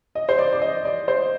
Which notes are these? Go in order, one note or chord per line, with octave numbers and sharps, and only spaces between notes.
D#5
C5
D5
D5
D#5
D5
C5